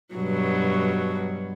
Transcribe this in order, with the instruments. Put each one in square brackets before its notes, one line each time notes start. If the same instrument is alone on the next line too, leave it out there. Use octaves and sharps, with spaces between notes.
[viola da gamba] G2 B2 F#3